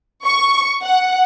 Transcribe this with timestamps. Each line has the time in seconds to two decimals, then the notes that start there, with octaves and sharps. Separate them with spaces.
0.24 C#6
0.82 F#5